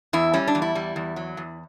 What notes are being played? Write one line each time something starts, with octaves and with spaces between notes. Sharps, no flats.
E2 E4
G3 C#4
D4
E2
E4
G3
E2
F#3
E2